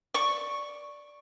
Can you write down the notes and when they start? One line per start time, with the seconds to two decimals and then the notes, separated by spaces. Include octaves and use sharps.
0.14 D5 C#6